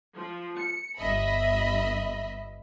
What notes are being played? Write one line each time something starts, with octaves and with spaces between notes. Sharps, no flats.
F3
C#7
G1 D#5 E5 B5